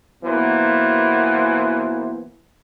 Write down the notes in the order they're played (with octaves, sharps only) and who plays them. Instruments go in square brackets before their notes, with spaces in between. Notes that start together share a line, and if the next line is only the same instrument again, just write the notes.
[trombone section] B2 E3 F#3 A#3 B3 C5